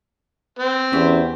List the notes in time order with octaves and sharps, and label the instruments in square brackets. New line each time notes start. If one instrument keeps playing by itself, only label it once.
[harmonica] C4
[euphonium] E2 [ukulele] C#4 G4